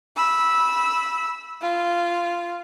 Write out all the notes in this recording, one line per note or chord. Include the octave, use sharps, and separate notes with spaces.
B5 E6
F4